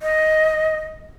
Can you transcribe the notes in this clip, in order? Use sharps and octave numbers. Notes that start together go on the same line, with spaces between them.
D#5